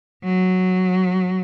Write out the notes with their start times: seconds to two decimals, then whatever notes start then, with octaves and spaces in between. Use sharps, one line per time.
0.23 F#3